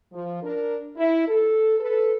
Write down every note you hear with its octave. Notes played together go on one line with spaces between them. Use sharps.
F3
D4 A#4
E4
A4
A4 B4